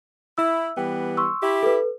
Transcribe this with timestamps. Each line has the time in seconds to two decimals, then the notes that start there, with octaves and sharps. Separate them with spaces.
0.38 E4 E5 E6
0.77 E3 G3 B3 G5
1.17 C6 C#6 E6
1.42 E4 G4 E5
1.63 A4 B4